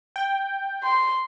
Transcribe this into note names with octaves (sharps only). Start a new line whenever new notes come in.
G5
C6